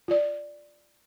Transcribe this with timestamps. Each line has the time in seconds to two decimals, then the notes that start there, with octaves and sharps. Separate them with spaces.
0.08 F4 D5